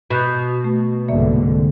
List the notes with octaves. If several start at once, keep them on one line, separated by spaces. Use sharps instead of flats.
B2 B5 F#6 G6
A3
C2 G#2 D3 A#3 D5 E5